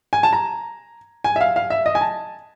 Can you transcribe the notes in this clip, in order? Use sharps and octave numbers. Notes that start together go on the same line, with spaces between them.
G#5
A5
A#5
G#5
E5
F5
F5
E5
D#5
G#5
A5